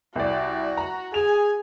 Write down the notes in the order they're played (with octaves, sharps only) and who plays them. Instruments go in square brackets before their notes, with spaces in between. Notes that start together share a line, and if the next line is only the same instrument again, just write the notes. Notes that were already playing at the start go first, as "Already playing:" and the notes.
[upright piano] C2 D5 [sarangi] F#4
[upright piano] A#5
[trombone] G#4 [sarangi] G#5 [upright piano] F7